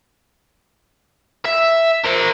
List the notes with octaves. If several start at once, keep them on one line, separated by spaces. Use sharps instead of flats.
E5
A#4 C5